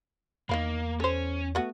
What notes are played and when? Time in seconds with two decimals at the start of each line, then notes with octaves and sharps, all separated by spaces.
0.49 E2 D#3 A#3 F5 B5
1.00 C#4 A4 C5
1.55 A3 B3 F#4